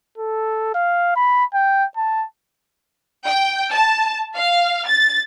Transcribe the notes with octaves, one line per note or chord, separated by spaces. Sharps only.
A4
F5
B5
G5
A5
G5
A5
F5
A6